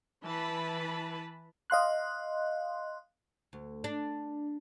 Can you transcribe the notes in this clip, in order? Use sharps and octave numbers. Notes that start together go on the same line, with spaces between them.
E3 B4 A5 B5
D#5 F5 C6 F#6
D2
D4